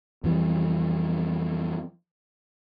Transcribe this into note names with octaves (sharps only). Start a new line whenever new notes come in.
F2 E3 G3